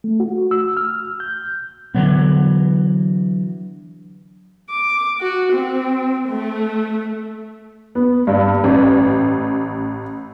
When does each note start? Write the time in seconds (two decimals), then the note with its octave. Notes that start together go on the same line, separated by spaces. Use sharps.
0.04 A3
0.20 F#4
0.51 E6
0.77 F6
1.20 G6
1.95 D3 E3 F#3 B3
4.70 D6
5.20 F#4
5.52 C4
6.29 A3
7.95 B3
8.27 G2
8.64 A1